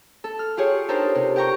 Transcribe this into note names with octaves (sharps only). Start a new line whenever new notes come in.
A4
F6
F4 G4 G#4 C#5
D4 D#4 G4 A4 A#4 C5
C3
G4 G5 A#5 C#6